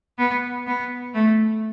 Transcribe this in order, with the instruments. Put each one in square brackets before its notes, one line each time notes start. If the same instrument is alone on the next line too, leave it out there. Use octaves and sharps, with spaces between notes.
[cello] B3
B3
A3